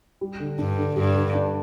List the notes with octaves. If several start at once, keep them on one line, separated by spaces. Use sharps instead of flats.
G3
D3
G2 D4
D3
G2 G3
D3
D4